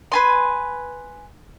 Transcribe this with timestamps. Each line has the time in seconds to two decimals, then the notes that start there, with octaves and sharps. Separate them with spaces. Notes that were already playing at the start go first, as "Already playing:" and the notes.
0.12 B4 G#5 C6